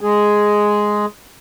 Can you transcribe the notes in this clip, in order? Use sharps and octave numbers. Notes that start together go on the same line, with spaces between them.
G#3 G#4